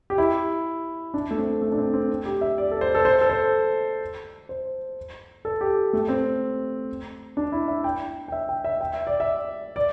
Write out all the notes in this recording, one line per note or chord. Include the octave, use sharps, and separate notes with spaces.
G4
E4
D4
A3
C4
A3
D4
C4
C4
G4
E5
D5
A4
C5
A4
C5
A4
C5
C5
A4
G4
A3
C4
D4
E4
E5
G5
G5
E5
G5
E5
G5
E5
D5
E5
D5